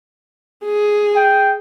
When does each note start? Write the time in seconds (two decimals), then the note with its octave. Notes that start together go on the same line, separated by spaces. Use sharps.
0.65 G#4
1.16 G5